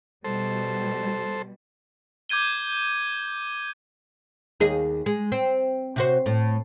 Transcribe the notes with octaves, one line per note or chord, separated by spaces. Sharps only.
B2 G3 A4 C5
D6 G6 G#6 D#7 G7
D#2 G#4 D#5
G#3
C4
C3 F#4 C5
A2